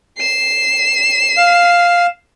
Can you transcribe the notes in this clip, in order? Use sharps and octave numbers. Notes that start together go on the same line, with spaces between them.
C7 E7
F5